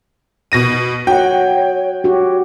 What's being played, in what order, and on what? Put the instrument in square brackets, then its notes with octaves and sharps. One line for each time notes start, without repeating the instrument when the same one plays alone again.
[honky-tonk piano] B2 A#6 D#7
[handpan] F#4 F#5 [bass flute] C#5 [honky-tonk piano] G5
[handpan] F#4 G4 [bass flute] C#5